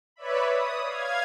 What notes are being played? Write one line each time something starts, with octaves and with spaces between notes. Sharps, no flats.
B4 C#5 D5 E5 B5
D#6
F5 G#6